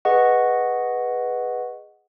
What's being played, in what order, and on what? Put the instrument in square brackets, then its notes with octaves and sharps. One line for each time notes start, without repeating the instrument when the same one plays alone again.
[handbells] G#4 B4 D#5 F#5 C#6